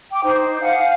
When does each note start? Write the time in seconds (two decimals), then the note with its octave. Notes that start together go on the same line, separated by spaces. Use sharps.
0.11 G5 D6
0.23 D#4 C5
0.61 F5 F#5 G#5